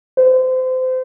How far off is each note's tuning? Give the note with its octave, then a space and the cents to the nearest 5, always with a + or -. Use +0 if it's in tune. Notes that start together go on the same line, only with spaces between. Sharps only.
C5 -30